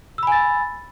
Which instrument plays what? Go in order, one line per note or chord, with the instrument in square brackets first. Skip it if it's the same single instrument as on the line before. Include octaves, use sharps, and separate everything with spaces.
[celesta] E6
B5
G#5
A6